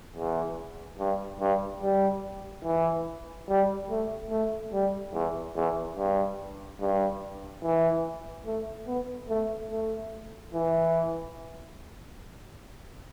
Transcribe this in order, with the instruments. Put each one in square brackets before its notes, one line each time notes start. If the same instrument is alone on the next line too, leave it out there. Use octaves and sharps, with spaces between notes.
[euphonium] E2
G2
G2
G3
E3
G3
A3
A3
G3
E2
E2
G2
G2
E3
A3
B3
A3
A3
E3